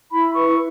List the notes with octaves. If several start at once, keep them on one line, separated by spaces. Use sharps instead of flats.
E4 B5
B4 C#6